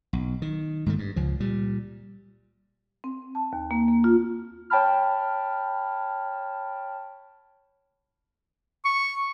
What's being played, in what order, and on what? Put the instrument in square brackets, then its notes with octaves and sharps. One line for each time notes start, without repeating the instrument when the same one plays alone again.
[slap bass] B1
D#3
G#2 D#3 A3
G2
C#2 F3
A#2 G3
[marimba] C4
A5
D#2
A#3
A#3
F4
[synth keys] C#5 G5 A5 B5 F6
[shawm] C#6